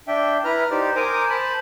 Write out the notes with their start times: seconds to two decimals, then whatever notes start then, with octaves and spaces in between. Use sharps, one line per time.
0.08 D4 E5 G5
0.44 E4 B4 A#5 F6
0.71 D#4 G4 C5 D5
0.96 A#4 C5 G#5 A#5 D6 D#6
1.30 C5 A5 B5